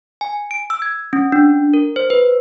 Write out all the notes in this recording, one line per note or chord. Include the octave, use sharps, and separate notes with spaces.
G#5
D7
E6
G#6
C#4
D4
A#4
C5
B4